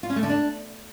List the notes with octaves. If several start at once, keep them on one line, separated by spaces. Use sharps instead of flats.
F4
C#4
A3
D3
D4